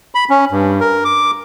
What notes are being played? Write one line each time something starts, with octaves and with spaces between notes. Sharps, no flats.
B5
C#4
G2
A#4
D6